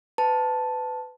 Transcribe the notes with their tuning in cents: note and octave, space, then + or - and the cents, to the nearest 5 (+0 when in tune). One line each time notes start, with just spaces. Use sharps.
B4 +25 A5 +0